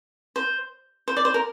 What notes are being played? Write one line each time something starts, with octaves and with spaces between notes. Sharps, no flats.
C5
C5
D5
C5
A#4